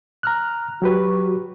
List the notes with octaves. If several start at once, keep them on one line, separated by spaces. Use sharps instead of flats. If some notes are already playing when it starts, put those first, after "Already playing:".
A#5 F6 F#6
F#3 F#4 G4 B4